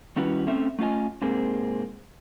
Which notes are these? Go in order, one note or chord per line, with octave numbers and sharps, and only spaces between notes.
D#3 G3 C#4 E4 F#4 B4
A3 C4 C#4 E5
A3 C#4 F4 D#5 G#5
G#2 C3 A#3 C4 G#4